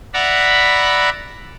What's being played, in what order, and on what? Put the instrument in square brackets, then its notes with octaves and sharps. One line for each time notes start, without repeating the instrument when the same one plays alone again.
[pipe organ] D5 E5 F#5 A#5 B5